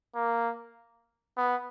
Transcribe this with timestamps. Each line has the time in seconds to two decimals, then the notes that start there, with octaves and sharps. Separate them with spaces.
0.15 A#3
1.37 B3